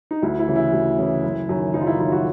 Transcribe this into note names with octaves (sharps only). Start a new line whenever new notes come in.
D#4
D2 E4
E4
C#3 E3
E4
D2
C#3 E3
F#1
F#2 D#3
F#1 D#4
F4
E4
F#2 D#3 E4
F#4